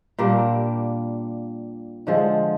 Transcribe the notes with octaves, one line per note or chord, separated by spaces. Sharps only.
A#2 G3 A#3 D4
D3 F3 G#3